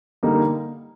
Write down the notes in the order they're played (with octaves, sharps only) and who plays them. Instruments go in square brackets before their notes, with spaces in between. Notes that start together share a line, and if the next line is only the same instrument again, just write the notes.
[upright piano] D3 G3 A#3 D#4